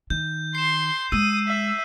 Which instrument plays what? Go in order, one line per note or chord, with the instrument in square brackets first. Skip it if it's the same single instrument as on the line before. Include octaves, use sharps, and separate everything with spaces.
[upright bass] D#3 [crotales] G6
[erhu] C6 [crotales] C7 E7
[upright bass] G#3 [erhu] D#6 [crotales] E6 D#7
[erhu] E5